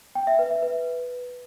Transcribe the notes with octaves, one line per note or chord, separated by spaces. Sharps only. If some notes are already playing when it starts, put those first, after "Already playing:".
G5
E5
B4
E5
B4